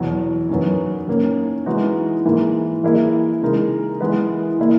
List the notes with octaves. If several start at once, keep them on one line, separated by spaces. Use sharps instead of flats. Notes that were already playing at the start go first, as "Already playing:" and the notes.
Already playing: E2 B2 F#3
F#2 D#3 F#3 B3
D#3 A#3 C#4
E3 G#3 B3 D#4 F#4
G#2 E3 A#3
E3 A#3 E4 G#4
C#3 G#3 D#4 A#4
E3 G#3 B3 E4 B4
A#2 A#3 E4